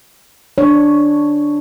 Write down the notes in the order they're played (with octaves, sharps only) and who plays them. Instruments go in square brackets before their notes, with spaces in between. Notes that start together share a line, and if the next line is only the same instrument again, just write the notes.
[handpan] D4 C#5